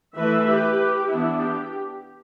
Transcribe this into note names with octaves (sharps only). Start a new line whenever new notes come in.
E3 A3 E4 B4 E5
G4 B4
G4
E3 B3 D4 E4
G4